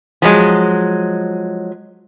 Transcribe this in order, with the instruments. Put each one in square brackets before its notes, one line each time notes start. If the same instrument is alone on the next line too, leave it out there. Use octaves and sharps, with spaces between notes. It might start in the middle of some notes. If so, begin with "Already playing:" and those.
[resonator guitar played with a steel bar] F3 F#3 G#3